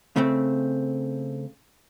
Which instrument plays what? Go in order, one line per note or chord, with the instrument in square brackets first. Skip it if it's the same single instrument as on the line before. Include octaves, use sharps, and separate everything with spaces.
[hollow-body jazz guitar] C#3 A3 C4